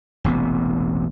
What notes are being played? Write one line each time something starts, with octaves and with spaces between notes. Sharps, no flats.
E1 A1 C3 B3